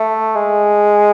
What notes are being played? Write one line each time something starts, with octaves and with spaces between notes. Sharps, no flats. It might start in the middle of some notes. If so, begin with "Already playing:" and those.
Already playing: A3
G#3